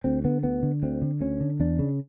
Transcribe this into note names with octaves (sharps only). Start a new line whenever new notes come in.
D2 C4
D3 B3
D2 B3
D3
D2 C4
D3
D2 C#4
D3
E2 D4
C#3